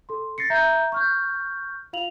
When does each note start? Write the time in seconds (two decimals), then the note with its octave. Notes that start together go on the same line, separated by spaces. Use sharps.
0.09 A4 C6
0.38 A6 A#6 C7 C#7
0.50 E5 A#5 G6
0.92 C#6 F6 G6
1.93 F4 F5 F7 F#7